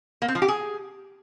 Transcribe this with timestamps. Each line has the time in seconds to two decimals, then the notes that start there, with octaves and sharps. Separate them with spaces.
0.22 A#3
0.28 C4
0.35 F3
0.42 G4
0.48 G#4